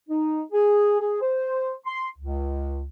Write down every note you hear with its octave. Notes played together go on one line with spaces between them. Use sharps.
D#4
G#4
G#4
C5
C6
C#2